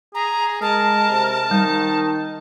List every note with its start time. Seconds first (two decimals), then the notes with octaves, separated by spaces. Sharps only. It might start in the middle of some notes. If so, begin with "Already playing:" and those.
0.15 G#4 A#5
0.62 G#3 A#4 A5
1.10 C3
1.51 D#3 G3 D#4